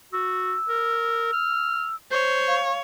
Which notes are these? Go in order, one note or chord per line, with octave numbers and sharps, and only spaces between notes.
F#4 E6
A#4
F6
C5 C#5
F5